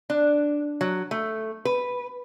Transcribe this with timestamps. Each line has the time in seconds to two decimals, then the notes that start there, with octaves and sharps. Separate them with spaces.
0.10 D4
0.81 F#3
1.11 A3
1.65 B4